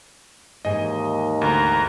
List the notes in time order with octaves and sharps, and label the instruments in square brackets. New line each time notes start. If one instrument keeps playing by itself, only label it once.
[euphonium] D#2 [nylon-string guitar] G#2 E3 G#5 [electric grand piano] D#5
[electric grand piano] D2 [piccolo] A#5